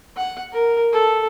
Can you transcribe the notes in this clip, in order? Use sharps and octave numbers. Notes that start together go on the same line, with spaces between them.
F#5
A#4
A4